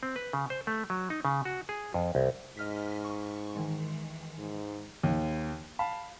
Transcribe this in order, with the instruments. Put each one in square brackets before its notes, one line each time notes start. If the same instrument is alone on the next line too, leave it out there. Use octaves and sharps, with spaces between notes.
[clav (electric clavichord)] C4
B4
C#3
C5
A3
F#3
D#4
C#3
F#4
G#4
F2
C2
[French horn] G#2 [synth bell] D#5 F6 B6
[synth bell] C#6
D#3 E3 G#3
[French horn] G#2
[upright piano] D#2
F5 A5 B5